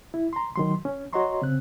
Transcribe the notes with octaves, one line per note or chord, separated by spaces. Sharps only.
E4
A#5 C6
D#3 F#3 C6
C#4
F#4 C#5 D#5 A#5 C6 C#6
C#3 C4 F#6